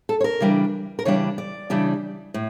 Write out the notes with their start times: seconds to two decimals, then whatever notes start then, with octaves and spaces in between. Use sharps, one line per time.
0.09 A4
0.21 C#5
0.24 A#4
0.40 C#3 E3 G3 D4
0.99 A#4
1.05 C#3 E3 G3 D4 C#5
1.38 D5
1.70 C#3 E3 G3 D4
2.34 A2